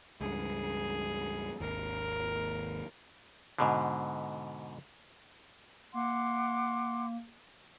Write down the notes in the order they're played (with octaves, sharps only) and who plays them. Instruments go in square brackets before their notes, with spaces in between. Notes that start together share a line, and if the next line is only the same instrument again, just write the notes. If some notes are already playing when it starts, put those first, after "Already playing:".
[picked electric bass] C#2 G2 [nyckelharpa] G#4
[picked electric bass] G#1 D#2 [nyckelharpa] A#4
[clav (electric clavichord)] G#2 B2 D3
[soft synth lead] A#3 [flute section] F#5 C6 D6